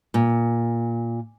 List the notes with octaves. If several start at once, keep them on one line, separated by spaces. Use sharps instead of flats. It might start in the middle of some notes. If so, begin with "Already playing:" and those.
A#2